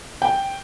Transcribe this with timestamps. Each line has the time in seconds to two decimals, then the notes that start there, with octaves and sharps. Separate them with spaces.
0.22 G5